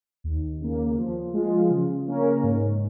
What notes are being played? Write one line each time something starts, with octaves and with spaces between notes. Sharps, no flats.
D#2
C#3 A#3
F3
G#3 F4
C#3
A#3 C#4 A#4
G#2